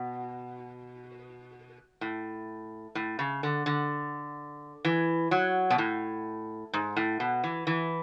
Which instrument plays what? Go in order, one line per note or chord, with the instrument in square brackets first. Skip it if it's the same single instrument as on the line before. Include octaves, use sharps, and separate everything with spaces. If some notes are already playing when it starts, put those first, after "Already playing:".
Already playing: [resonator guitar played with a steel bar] B2
A2
A2
C#3
D3
D3
E3
F#3
B2
A2
G#2
A2
B2
E3
E3